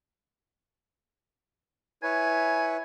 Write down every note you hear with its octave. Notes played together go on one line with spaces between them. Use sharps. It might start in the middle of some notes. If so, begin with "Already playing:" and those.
E4 B4 C#5 G#5